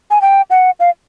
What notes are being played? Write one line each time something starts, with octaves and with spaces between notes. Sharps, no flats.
G#5
G5
F#5
F5